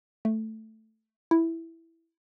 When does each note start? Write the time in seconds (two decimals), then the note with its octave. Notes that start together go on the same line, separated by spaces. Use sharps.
0.25 A3
1.31 E4